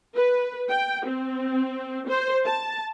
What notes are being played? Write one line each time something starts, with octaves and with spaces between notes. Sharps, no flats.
B4
G5
C4
C5
A5